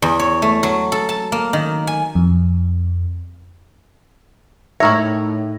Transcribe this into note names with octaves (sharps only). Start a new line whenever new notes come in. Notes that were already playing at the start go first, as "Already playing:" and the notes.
E2
C#5
A3
F#3
A4
A5
A#3
D#3
G#5
F2
A2 D#4 E4 A#4 C#5 E5 C#6 A#6